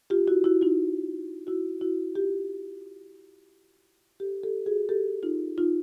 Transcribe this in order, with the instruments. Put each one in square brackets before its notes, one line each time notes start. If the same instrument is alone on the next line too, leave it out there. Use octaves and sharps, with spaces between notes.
[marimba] F4 G4
E4 F#4
E4 F#4
D#4 F4
E4 F#4
E4 F#4
F4 G4
G4 A4
G4 A4
F#4 G#4
G4 A4
D#4 F4
D#4 F4